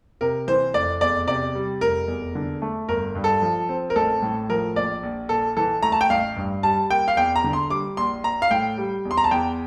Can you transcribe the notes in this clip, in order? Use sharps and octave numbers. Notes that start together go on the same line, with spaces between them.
C3 A#4
E3 C5
F1 D5
E2 D5
C3 D5
G3
F1 A#4
E2
D3
A3
G1 A#4
G2
A4
F3
C4
A#4
A1 A4
A2
F3 A#4
A#1 D5
A#1
A#2 A4
E3 A4
A3 A#5
A5
G5
A1 F5
G2
G3 A5
A#3 G5
F5
E2 G5
A#5
D3
C6
G3 D6
A#1 C6
A#1 A#5
F5
A2 G5
G3
E2
C6
A#5
A5
E2 G5